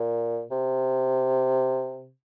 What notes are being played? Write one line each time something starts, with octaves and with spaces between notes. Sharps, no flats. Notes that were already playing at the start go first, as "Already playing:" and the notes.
Already playing: A#2
C3